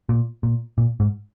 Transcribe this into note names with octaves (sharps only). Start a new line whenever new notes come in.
A#2
A#2
A#2
G#2